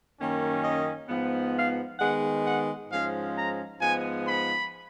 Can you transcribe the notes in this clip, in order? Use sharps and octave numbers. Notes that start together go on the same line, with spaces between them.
F#2 D#3 A#3 C#4
D#5
G#2 F3 B3
F5
D#3 G#3 B3 F#5
F#5
G#2 F3 G#3 C#4 F5
A#5
G#2 F3 G#3 B3 G#5
B5